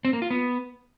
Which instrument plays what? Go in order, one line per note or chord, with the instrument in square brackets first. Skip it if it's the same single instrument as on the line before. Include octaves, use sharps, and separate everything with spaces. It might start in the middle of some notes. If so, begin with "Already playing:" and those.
[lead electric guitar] C4
A#3
F4
B3